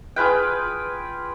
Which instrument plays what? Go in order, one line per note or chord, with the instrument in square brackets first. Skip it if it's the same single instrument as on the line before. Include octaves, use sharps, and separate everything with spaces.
[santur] F4 G#4 B4 G5